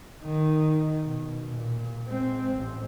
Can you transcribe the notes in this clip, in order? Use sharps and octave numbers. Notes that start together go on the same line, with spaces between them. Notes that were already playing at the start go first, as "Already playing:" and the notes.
D#3
B2
A#2
G#3 C4
A1